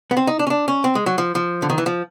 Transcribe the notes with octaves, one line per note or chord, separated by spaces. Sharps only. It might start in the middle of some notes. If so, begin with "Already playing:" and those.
B3
C4
D#4
D4
C#4
D4
C#4
C4
G#3
F#3
F3
F3
D3
D#3
E3
F3